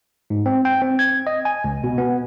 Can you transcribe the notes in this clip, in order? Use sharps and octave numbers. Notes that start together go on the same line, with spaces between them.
G#2
C4
G5
C4
G#6
D#5
G#5
C#2
B2
B3